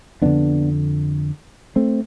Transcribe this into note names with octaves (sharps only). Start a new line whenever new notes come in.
F2 D3 B3 D4
A3 C4